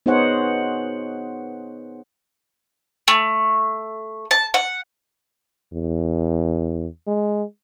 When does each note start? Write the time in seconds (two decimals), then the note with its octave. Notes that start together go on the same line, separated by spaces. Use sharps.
0.06 B3 D#4 G#4 C5 C#5 F#5
3.08 A3
4.31 A5
4.54 F#5
5.73 E2
7.07 G#3